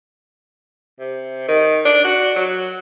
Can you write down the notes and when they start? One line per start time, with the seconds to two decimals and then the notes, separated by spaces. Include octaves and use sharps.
0.99 C3
1.48 D#3
1.85 D4
2.04 F#4
2.36 F#3